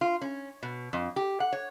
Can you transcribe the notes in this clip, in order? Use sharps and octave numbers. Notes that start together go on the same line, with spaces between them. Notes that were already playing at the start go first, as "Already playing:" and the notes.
F4
C#4
B2
F2
G4
F#5
C#5